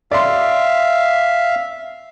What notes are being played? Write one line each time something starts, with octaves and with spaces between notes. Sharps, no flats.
D5 E5 F5 C6